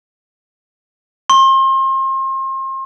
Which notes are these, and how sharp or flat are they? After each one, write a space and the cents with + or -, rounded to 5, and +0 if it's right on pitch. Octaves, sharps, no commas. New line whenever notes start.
C6 +35